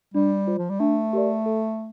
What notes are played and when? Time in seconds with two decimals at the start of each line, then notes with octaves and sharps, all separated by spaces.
0.14 G3 D4
0.47 F4 C5
0.58 F3
0.70 G3
0.80 A3 D4
1.13 G4 A#4 D5
1.46 A4